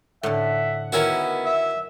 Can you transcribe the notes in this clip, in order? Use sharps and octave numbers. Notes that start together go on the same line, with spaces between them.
A2 D3 E5 F#5
D#3 B3 C#4 E4 F#4 A#4
E5